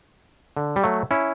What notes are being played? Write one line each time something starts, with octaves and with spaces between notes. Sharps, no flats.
D3
G3
F#3 A3
C#4 E4